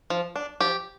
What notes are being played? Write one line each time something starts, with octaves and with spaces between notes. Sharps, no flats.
F3
D4
F3 G4